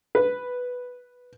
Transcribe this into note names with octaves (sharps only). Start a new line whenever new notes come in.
B4